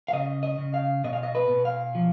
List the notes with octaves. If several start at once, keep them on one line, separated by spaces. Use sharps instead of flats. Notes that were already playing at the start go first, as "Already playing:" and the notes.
F5
C#3 D#5
D#5
C#3
F5
B2 D#5
F5
D#5
B4
B2
F5
F3